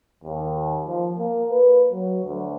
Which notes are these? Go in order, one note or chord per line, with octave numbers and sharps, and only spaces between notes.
D#2
F3
A#3
B4
F#3
D2